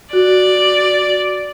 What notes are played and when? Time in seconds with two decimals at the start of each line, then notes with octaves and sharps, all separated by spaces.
0.13 F#4 D5